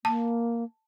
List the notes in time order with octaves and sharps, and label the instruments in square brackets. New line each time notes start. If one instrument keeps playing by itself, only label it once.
[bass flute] A#3 [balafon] A5